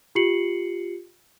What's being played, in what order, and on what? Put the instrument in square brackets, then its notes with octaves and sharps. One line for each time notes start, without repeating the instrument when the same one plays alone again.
[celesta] F4 G4 C7 C#7 F#7